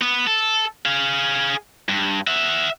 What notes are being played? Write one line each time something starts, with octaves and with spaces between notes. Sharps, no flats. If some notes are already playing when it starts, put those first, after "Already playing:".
B3
A4
G#4 F5
G2
E5 F#5